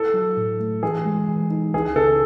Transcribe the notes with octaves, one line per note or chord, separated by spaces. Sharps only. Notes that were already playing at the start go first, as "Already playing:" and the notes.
Already playing: E4 A4
F#3
A2
A3
E3 G#4
G#3
E3
D#4
C#2 G#4
C#3 A4